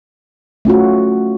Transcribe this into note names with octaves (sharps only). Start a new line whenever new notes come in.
A3 C#4 F4 F#4